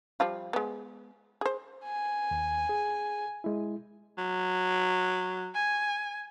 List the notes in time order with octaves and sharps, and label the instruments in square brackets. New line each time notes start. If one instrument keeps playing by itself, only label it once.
[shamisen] F3 G3 F4
G#3 B3
G#4 C5
[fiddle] G#5
[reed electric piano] D#2
G#4
G#3 E4
[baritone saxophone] F#3
[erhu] G#5